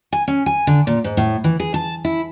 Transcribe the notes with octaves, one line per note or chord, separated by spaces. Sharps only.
G#5
C#4
G#5
D3
A#2
G#2
A2
E3
G#4
A5
E4